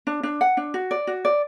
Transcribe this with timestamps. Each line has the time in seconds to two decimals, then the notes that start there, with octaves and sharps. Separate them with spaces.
0.07 D4
0.23 D4
0.41 F#5
0.57 D4
0.74 F#4
0.91 D5
1.07 F#4
1.25 D5